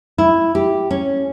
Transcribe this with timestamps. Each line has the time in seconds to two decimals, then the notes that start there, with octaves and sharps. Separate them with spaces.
0.18 E4
0.55 G4
0.91 C#4